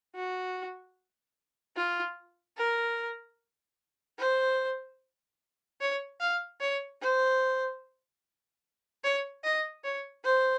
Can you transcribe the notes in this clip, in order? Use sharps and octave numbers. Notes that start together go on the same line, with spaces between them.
F#4
F4
A#4
C5
C#5
F5
C#5
C5
C#5
D#5
C#5
C5